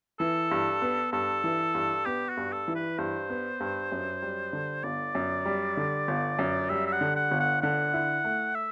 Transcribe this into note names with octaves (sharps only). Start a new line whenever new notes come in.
E3 A4
G2
B3
G2 A4
E3
G2
B3 G4
F#4
G2
A4
E3
B4
G2 C5
B3
G2
F#2
G3
D3
G1 D5
F#2
G3
D3
G1
F#2
G3 E5
E5
F#5
D3
F#5
G1
F#5
D3 F#5
E4
A3
E5